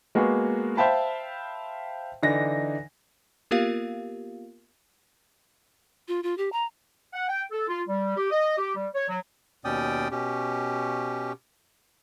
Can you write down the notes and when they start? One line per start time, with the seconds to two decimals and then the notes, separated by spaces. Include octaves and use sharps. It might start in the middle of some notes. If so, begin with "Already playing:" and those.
0.15 G#3 A#3 B3 F#4
0.77 C5 E5 F5 G5 A5 B5
2.23 D3 E3 D4 D#4 A#6
3.51 A#3 B3 F4 G4 A#4 F5
6.08 F4
6.23 F4
6.38 G4
6.52 A#5
7.14 F#5
7.29 G5
7.52 A4
7.68 F4
7.88 G3
8.17 G4
8.31 D#5
8.58 G4
8.76 G3
8.95 C#5
9.09 F#3
9.65 D#2 B2 C#4 D5 G5 D#6
10.11 B2 C#4 G4